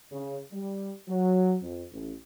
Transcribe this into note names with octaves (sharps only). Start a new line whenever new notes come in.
C#3
G3
F#3
F2
A1